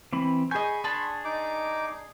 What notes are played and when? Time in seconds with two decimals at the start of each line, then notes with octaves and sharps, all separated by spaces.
0.13 E3 C4 B5
0.51 G#4 D#5 G#5 B5 C#6 G6
0.84 D4 G#4 A5 C6
1.24 D#4 D6